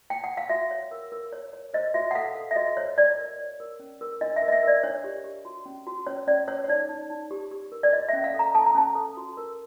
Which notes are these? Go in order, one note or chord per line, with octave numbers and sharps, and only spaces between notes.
G5
F#5
F5
F#4 E5
C#5
A#4
A#4
C#5
C#5
C5 D#5
F#4 E5
F#5
A4 F5
A4
E5
F#4 D#5
C5 C#5
C#5 D5
A#4
C#5
A#4
C#4
A#4
D4 D#5
E5
A#4
D#5
E5
A#4 D5
D4 C#5
G4
G4
F#4
C#4
F#4
C#4 C#5
C#4 D5
C#4 C#5
C#5
D#4 D5
D#4
D#4
G4
G4
A#4
D5
C#5 D#5
C#4 E5
F5
A4
A#5
A4 A5
A#5
C#4 A5
A4
F#4
A#4